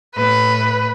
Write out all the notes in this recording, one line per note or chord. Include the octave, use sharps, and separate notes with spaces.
A2 B4